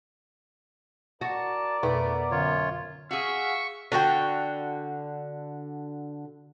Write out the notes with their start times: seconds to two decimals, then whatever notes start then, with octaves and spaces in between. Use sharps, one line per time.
1.21 F#4 A#4 D5 A5
1.83 F2 B2 A3 B3
2.31 F#2 D3 F4 C#5
3.11 F#4 G#4 E5 F5 C#6
3.92 D3 F#4 A4 G5